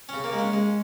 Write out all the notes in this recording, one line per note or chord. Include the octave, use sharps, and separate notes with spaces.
C#3 C#4
A#3
G#3
C#4
G#3